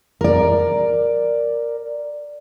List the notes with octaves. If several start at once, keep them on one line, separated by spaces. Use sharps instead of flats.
A#4 D5